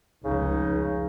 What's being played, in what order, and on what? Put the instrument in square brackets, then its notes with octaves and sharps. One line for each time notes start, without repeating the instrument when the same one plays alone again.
[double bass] F1 C#2 [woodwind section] C#3 D#4